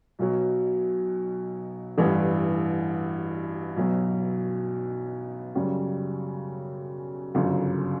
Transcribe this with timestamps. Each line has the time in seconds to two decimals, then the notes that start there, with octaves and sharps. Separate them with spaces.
0.19 B1 B2 F#3
1.98 A1 G2 E3
3.76 B1 B2 F#3
5.55 F#2 C#3 G3
7.34 G1 F#2 C#3